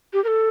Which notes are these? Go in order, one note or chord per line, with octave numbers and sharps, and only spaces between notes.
G4
A#4
A4